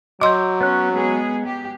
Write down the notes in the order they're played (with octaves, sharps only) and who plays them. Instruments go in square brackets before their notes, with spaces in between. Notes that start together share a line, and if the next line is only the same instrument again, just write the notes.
[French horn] F#3 [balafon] D#5 C6 [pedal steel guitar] D6 E6 G6
[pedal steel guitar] B3 F#6 [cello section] C#4
[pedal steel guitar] G#3 [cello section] B3 G#4
[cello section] G4